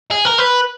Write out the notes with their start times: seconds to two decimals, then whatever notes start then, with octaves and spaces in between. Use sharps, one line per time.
0.11 G#4
0.25 A#4
0.38 B4